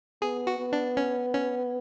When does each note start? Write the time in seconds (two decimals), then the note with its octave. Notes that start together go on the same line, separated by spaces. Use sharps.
0.22 B3 G#4
0.47 F#4
0.59 B3
0.73 D4
0.97 C#4
1.35 C#4